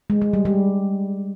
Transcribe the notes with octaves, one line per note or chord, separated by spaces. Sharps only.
G#3
G#3
G3
G3